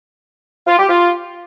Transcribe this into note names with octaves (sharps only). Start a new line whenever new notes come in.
F4
G4
F4